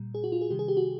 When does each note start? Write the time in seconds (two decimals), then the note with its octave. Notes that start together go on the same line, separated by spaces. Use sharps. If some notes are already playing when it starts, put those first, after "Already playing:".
Already playing: A#2 G3
0.15 G#4
0.24 F#4
0.32 F4
0.41 G#4
0.50 C3 D#3 G3 G4
0.59 G#4
0.68 G4
0.77 F#4